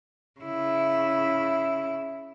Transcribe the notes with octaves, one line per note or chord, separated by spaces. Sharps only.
C#3 E4